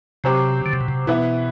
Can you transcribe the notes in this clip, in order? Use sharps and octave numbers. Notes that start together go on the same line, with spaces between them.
C3 F#3 C4 G4
D3
C3
B2
C3
B2 E3 B3 E4